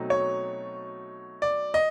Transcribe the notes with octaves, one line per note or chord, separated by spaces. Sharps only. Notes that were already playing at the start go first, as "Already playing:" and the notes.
Already playing: B2 F#3 A3 C4 D#4
C#5
D5
D#5